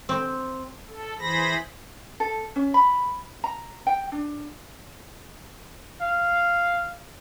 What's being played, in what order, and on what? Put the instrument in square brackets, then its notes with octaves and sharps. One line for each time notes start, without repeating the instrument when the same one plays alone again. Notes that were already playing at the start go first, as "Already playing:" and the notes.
[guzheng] C4
[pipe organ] A4
E3 G#4 C5 B5 A#6
[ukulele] A4
C#4
B5
A#5
G5
D4
[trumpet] F5